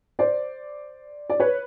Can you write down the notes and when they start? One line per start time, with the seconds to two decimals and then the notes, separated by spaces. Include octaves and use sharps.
0.19 C5 D5
1.30 D5
1.40 B4 C#5